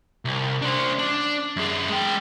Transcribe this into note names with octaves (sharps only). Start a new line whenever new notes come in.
C2
D4 C5
D4
F#2 G#4
G#3 G5